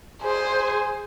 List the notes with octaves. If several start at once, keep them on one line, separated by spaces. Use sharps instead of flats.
G#4 C5 G#5